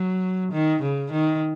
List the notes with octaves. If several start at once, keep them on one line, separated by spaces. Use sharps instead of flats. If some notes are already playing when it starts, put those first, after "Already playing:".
Already playing: F#3
D#3
C#3
D#3